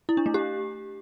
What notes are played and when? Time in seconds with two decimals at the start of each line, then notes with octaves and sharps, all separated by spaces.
0.09 E4
0.17 D4
0.26 A3
0.34 G4